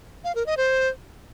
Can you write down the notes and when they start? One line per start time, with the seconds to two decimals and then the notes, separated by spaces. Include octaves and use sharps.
0.24 F5
0.35 A#4
0.46 D#5
0.57 C5